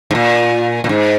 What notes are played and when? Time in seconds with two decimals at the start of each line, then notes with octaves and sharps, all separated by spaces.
0.11 G#2
0.15 A#2
0.84 A#2
0.89 G#2